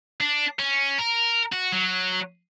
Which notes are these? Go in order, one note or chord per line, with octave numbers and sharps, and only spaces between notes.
D4
C#4
A#4
F#4
F#3